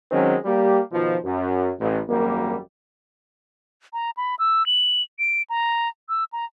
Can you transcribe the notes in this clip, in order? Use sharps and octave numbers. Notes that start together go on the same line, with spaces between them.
D#3 F#3 G#3 C4 C#4
G3 A#3 G4
B2 D#3 F3
F#2
A1
G#1 F#2 G3 A#3
A#5
B5
E6
F#7
D7
A#5
E6
A#5